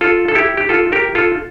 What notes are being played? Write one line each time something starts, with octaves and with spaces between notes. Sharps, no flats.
F4 A4
A4
E4 G4
G4
F4 A4
G4 A#4
F4 A4